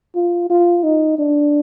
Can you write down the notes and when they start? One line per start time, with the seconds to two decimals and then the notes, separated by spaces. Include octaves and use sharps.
0.15 F4
0.50 F4
0.83 D#4
1.19 D4